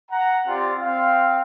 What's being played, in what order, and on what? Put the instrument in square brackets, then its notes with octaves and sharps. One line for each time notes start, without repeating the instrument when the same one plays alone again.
[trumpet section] F#5 A#5
C4 F4 G4 D5
C4 F5